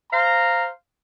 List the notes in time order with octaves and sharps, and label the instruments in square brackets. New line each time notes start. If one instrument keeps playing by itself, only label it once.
[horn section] C5 F5 A#5